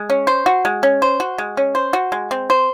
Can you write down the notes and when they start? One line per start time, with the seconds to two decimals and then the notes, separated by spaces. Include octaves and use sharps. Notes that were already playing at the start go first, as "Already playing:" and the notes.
Already playing: G#3
0.10 C#4
0.27 C5
0.46 F#4
0.65 G#3
0.83 C#4
1.02 C5
1.20 F#4
1.38 G#3
1.57 C#4
1.75 C5
1.93 F#4
2.12 G#3
2.31 C4
2.50 C5